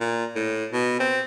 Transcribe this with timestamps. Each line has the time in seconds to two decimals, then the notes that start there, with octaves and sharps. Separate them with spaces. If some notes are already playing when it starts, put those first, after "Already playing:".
0.01 A#2
0.36 A2
0.72 B2
1.00 C4